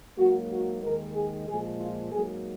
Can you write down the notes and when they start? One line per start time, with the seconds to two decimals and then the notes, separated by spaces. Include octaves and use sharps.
0.18 G#2 F#3 A#3 F#4
0.51 F#4
0.82 D#2 D#3 G#3 A#4
1.14 G#4
1.48 A#2 F3 G#3 G#4
1.80 F4
2.11 G#2 F#3 A#3 G#4